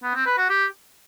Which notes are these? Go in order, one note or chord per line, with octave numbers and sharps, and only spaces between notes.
B3
C4
B4
F#4
G4